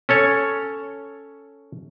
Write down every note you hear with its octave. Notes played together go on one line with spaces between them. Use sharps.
C#4 A4 C#5